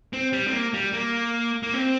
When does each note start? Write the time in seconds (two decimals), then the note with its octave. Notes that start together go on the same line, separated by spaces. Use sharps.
0.13 C4
0.33 G3
0.48 C4
0.53 A#3
0.73 G3
0.93 A#3
1.63 A#3
1.74 C4